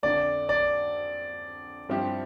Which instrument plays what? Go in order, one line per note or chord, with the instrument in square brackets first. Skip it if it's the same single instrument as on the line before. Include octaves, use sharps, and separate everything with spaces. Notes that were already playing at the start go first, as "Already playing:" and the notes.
[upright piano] F2 D3 A3 [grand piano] D5
[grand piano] D5
[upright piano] G2 F3 C4 E4 G4